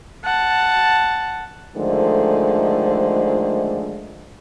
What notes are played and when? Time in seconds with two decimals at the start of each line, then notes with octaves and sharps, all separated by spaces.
0.24 F#5 A5
1.76 D3 D#3 F3 G#3 A3 C5